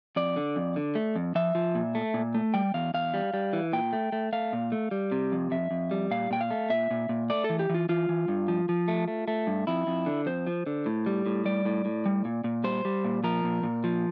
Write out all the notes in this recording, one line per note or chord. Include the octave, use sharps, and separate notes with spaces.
F2 D5
D3
F2
D3
A3
F2
F3 E5
F3
A#2
A3
A#2
A3
G3 G5
E2 F5
E2 F5
G3
G3
E3
A#2 G5
A3
A3
A3 F5
A#2
A3
G3
C3
F2
F2 E5
F2
G3
A#2 F5
A#2 G5
F5
A3
A#2 E5
A#2
A#2
A3 D5
A4
E3
G4
E3 F4
E3 F4
E3
G2
F3
F3
A3
A3
A3
G2
F2 E4
F2
D3
F2 C5
F3
D3
A2
G3
A2
G3 D5
A2
A2
G3
A#2
A#2
G3 C5
G3
A#2
F3 A#4
A#2
A#2
F3